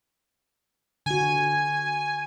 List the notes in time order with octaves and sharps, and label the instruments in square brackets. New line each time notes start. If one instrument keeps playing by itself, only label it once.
[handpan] D3 F#4 [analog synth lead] G#5